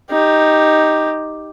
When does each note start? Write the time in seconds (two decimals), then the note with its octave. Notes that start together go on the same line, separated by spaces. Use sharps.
0.11 D#4 G4